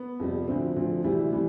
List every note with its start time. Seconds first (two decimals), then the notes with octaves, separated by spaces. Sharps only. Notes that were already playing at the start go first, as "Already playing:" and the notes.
Already playing: B3
0.20 F2 C3 G3
0.47 D2 D3 F3 C4
0.76 D2 D3 F3
1.04 D2 C3 E3 G3 E4
1.33 E3 G3